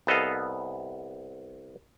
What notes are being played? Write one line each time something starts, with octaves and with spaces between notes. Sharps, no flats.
C2 B3 A4 D#5 F5